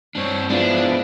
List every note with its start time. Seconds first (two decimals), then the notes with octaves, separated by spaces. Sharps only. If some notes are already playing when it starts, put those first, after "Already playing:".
0.15 G2 C4 D4 C#5
0.50 F3 G#3 B3 D4 E4